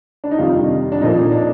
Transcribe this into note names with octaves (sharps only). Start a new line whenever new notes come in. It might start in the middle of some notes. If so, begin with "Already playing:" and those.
D4
D#4
F2 C3 D#3 G3 F4
D4
A#2 F3 A#3 D#4
D4